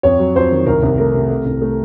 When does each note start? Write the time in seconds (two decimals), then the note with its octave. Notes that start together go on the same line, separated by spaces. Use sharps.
0.03 F2 C#5
0.19 F#3
0.35 F2 C5
0.51 D#3
0.66 C2 A#4
0.82 C2
0.98 A3 A#4
1.14 C3
1.29 A3
1.45 C2
1.62 A3